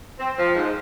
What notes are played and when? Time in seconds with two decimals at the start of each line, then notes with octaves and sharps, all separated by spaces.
0.19 C4
0.38 F3
0.56 G#2